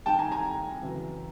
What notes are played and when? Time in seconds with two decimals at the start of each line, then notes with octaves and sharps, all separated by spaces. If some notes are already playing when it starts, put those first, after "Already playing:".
0.06 C2 C3 D#3 G5 A5
0.19 G#5 A#5
0.32 G#5 A#5
0.83 F#2 C#3 E3